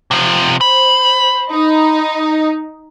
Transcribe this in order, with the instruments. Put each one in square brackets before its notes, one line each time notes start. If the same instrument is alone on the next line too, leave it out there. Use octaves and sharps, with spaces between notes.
[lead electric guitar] C3 F3
[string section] C5 [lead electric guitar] B5
[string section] D#4